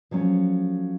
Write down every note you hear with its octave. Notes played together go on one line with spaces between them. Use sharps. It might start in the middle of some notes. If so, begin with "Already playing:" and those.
F3 F#3 A3 C#4